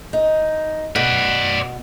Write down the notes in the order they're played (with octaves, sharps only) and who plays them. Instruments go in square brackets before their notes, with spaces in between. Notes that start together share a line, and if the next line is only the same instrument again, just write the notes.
[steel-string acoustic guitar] D#4
[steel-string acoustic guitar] B2 [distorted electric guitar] B4 D5